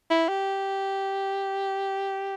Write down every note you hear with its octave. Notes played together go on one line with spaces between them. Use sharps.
E4
G4